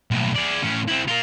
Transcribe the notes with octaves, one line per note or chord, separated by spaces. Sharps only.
B1 A2
G#4 D5
A2 C#4
C4 E4
F4 A#4